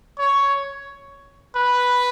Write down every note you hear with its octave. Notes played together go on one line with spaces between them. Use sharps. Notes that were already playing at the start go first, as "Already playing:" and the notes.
C#5
B4